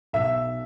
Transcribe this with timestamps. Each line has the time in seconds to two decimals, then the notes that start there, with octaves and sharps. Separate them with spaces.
0.13 B1 E5